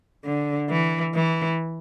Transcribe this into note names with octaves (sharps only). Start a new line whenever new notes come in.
D3
E3
E3